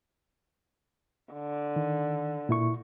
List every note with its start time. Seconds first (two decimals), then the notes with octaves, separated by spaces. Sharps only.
1.33 D3
1.76 D#3
2.49 A#2 E4 C#6